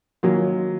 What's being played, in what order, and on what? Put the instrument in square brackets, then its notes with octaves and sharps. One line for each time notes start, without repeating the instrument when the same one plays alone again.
[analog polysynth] D#3 A#3 C#4 F4 [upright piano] F#3